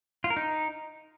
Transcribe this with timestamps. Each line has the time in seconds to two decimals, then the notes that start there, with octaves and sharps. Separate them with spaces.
0.24 F4
0.30 A#4
0.37 D#4